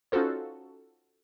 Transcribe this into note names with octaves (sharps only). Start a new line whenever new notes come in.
C#4 D#4 F4 F#4 A4 C5